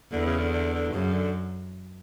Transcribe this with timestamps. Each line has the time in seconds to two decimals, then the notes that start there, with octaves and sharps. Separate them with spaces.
0.13 E2 D3
0.26 C#3
0.40 D3
0.53 D3
0.74 D3
0.94 F#2 C#3
1.13 D3